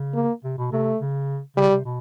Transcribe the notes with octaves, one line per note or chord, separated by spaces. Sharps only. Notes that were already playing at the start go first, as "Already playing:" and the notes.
Already playing: C#3
A#3
C3
B2
C3 A3
C#3
C#3 G3
C3
B2